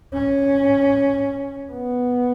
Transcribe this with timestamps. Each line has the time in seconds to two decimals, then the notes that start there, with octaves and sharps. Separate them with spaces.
0.14 C#4
1.72 B3